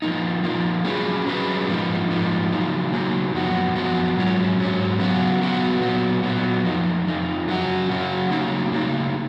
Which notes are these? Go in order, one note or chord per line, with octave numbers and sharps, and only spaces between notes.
F3 A#3 D#4
F3 A#3 D#4
F#3 C#4 G#4 B4
F#3 C#4 G#4 B4
G#2 F3 A#3 D#4
G#2 F3 A#3 D#4
C#3 F#3 A#3 D#4
C#3 F#3 A#3 D#4
F#2 F3 B3 F#4
F#2 F3 B3 F#4
G#2 F#3 C#4
G#2 F#3 C#4
C#3 F#3 B3 F#4
C#3 F#3 B3 F#4
A#2 F#3 B3
A#2 F#3 B3
F2 F3 D#4
F2 F3 D#4
C#3 F#3 C#4 F#4
C#3 F#3 C#4 F#4
C#3 F#3 A#3 D#4
C#3 F#3 A#3 D#4